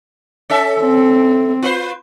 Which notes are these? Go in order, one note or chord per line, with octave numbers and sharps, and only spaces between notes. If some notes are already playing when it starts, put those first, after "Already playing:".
C#4 A4 E5
C4
F4 B4 C5